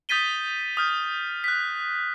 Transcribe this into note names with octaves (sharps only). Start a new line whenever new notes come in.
D#6 G6 A6 B6 D#7 G7
D#6 F6 G6
F#6 B6